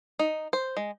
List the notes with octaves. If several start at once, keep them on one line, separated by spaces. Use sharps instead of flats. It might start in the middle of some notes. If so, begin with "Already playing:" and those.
D#4
C5
G#3